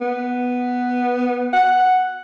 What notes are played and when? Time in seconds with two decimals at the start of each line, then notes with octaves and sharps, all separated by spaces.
0.01 B3
1.53 F#5